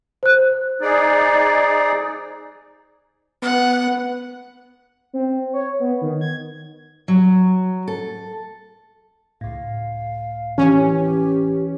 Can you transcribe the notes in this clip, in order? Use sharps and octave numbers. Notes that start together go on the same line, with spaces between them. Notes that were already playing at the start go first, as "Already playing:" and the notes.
C5 F#6
D#4 G#4 D5
B3 F#5
C4
C#5
B3
D#3
G#6
F#3
A4
C#2 A2 F5
E3 C#4 G4